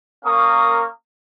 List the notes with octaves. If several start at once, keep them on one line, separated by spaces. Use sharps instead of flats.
A#3 C#4 A#4 F5 C#6 D#6